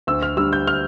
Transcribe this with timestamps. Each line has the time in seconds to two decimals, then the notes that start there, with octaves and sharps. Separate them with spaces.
0.07 D2 E6
0.23 F6
0.37 D3 G3 E6
0.53 G6
0.68 F6